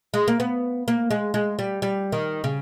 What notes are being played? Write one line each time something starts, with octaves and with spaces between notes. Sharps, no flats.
G#3
A#3
B3
A#3
G#3
G#3
G3
G3
D#3
C#3